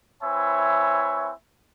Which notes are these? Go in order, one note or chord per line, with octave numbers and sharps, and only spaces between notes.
C4 E4 B4 C#5 E5 G#5